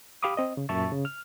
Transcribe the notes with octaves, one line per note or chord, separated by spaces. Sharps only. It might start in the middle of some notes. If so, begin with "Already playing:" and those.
G4 F5 B5 D6 D#6
C4 D#5
C#3
F#2 A#2 E5 A5 C#6 A6
C#3
F6